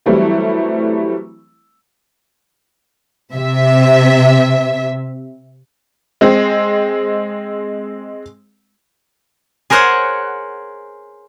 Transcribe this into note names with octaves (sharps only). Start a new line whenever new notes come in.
E3 F#3 G3 A3 C4 E4
C3 E5
G#3 C4
G#4 A#4 C5 C#5 F#5